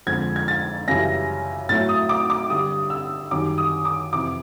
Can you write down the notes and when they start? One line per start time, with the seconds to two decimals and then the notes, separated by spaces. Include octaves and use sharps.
0.07 F2 D3 F3 G#3 G#6
0.36 G#6
0.48 A6
0.88 F#2 C#3 E3 G3 A#6
1.69 A2 F#3 A3 A6
1.89 D#6
2.09 D6
2.30 D6
2.50 G2 D3 G3 D#6
2.90 E6
3.31 F#2 D#3 G3 D6
3.58 D#6
3.85 D6
4.13 F2 C3 E3 D6